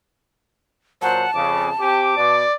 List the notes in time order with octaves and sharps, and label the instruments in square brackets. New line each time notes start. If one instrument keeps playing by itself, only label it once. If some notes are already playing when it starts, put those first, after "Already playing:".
[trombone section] A#2 F#3 C5 [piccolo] F#5 [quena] A5
[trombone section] F2 C#3 [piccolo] D6
[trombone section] C4 G4 [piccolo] D6
[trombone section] B2 [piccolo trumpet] D5